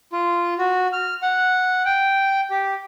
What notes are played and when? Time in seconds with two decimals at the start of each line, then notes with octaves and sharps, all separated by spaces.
0.13 F4
0.58 F#4
0.93 F6
1.22 F#5
1.85 G5
2.50 G4